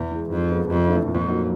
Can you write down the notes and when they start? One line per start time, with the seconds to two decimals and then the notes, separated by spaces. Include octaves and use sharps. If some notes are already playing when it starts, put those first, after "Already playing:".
Already playing: E2
0.12 E3 G#3
0.30 F2 G#2
0.50 F3 G#3 B3
0.69 F2 C3
0.88 E3 A3 D4
1.07 F2 A#2
1.26 F#3 A#3 D#4 F#4